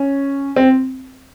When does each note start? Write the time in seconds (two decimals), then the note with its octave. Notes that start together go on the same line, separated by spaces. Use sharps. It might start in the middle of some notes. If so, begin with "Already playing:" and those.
Already playing: C#4
0.56 C4